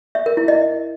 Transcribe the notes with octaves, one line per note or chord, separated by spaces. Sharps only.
E5
A#4
E4
D#5